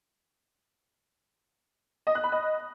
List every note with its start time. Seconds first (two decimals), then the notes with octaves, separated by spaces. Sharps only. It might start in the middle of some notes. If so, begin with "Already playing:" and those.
2.07 D#5
2.15 F#6
2.24 B5
2.32 D#5